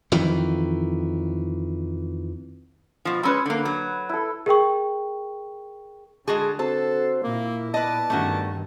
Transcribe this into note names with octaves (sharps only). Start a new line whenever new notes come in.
F2 D#3 E3
B2 F3
G#3 C#4 B4 B5 E6
D3 A#3
F#3
E4 A4
G#4 A#4 G5 C#6
D3 G#3 F#4 G#4 A5
C4 F#4 A4 C5 A5
A#2 A#3 E4 A#4
B3 B4 D5 D#5 A5
G2 D#3 A3 C#4 F#4